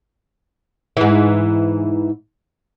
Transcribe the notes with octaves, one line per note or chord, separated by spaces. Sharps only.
G#2 E3